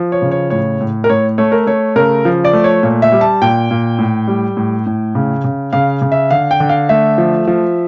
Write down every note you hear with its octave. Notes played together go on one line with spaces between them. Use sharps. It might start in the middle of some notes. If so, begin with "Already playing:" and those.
Already playing: F3
C#5
C#3
C#5
A2 C#5
A2
A#4
A2 C#5
A3 C#5
A#4
A3 C#5
C#3 A#4
F3
D5
A3
C#5
A#2
E5
G3
A5
A#2 G5
A#2
A2
G3
A2
A2
C#3
C#3
C#3 F5
C#3
E5
D3 F5
G5
D3
F5
A3 E5
F3
F3